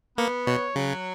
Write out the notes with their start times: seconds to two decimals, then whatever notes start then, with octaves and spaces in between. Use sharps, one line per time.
0.18 A#3 B3
0.47 B2 C#5
0.76 C#3 F#3